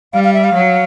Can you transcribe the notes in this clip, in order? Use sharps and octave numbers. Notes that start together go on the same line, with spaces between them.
G3 F5
F5
E5
F5
F#3